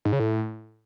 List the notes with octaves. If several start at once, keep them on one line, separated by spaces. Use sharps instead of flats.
G#2
C#3
A2